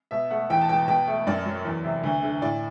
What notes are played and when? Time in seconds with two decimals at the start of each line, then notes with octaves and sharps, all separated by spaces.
0.11 B2 E5
0.30 A3 F#5
0.50 E2 G5
0.61 A5
0.69 B2 G5
0.88 B2 G5
1.08 A3
1.27 F#2 D5
1.46 F#3
1.65 E2
1.85 C3
2.03 D2
2.23 D3
2.42 A2 D5